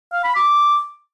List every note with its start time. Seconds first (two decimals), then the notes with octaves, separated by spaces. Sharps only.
0.12 F5
0.24 B5
0.36 D6